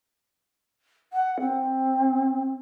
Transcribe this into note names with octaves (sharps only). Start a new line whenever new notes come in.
F#5
C4